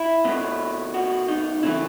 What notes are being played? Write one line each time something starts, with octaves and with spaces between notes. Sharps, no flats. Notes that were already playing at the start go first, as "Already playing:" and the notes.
Already playing: E4
B2 A3
F#4
D#4
C#3 E3 A3 E4